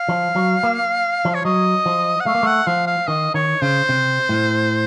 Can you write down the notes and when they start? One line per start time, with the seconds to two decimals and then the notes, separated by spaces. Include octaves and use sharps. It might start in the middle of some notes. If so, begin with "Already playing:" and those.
Already playing: F5
0.09 F3
0.36 F#3
0.63 A#3
1.25 F3
1.34 C#5
1.45 F#3 D#5
1.86 F3
2.20 F#5
2.26 A3 F5
2.35 A#3
2.43 A3 F#5
2.67 F3 F5
2.87 F5
3.07 D#3 D#5
3.34 D#3 C#5
3.62 C#3 C5
3.89 C3
4.29 A2